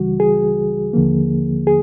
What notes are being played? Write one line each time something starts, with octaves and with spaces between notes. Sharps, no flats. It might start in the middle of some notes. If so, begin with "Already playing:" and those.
Already playing: C#2 C#3 E3 G3 F#4
G#4
D#2 D3 F3 A#3
G#4